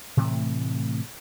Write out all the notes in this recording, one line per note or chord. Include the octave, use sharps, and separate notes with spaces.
A2 C3 E3 A3